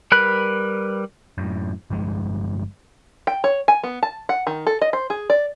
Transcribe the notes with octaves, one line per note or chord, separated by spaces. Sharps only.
G3 A#4 B4 B5 F#6
F#2 A2
G1 G2 F3 G#3
G5
C#5
G#5
B3
A5
F#5
D#3
A4
D#5
C5
G#4
D5